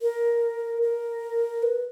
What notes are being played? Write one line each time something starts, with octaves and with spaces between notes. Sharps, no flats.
A#4
A#4
B4